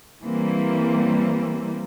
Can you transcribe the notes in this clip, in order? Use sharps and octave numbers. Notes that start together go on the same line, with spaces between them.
E3 G3 A#3 C4